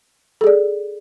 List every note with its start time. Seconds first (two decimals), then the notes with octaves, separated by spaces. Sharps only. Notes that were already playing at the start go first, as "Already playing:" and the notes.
0.41 A4
0.44 G#4
0.47 D5